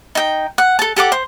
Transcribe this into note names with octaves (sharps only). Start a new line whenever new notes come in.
D#4 G5
F#5
A4 A5
G4 A4 F#5 D6
C5